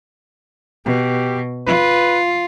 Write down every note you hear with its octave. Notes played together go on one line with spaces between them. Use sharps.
B2 G4
F4 B4